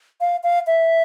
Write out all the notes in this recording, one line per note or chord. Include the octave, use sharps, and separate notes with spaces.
F5
F5
E5